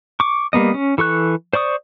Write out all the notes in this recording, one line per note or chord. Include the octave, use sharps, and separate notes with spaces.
C#6 D6
G3 A#3 B3 D#5
C#4
E3 A4 C#6 F#6
C5 D5 C#6 D#6